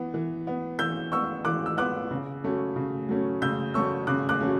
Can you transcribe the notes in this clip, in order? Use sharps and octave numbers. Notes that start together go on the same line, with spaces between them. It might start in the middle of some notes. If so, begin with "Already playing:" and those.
Already playing: E3 B3
E3
B3
E3 E6 G6
B3 C#6 E6
E3 D6 F#6
E6
B3 D6 F#6
C#3
F#3 A3 C#4
C#3
F#3 A3 C#4
C#3 E6 G6
F#3 A3 C#4 C#6 E6
C#3 D6 F#6
D6 F#6
F#3 A3 C#4